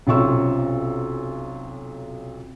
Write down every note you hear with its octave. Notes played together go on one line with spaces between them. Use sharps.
B1 C3 C#4 F4 C#6 E6